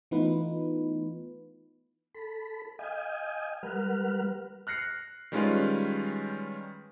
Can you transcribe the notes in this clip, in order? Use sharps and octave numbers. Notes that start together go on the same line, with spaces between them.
E3 A3 B3 D#4 F4 B4
A4 B5
D#5 F5 G5 G#5 D#6
G3 A#4 B4 F#5 F6
F6 F#6 A#6 C7 C#7
D#3 G3 G#3 C#4 F4 B4